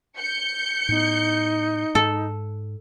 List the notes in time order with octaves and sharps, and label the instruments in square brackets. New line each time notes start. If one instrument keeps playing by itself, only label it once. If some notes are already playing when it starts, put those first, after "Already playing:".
[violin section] G6 C#7
[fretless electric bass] A2 B3 [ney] D#4
[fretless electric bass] G#2 [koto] A4